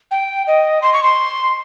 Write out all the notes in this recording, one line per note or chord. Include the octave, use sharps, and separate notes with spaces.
G5
D#5
C6
C#6
C6